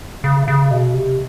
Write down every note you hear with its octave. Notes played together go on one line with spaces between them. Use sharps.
C#3
C#3
B2
C3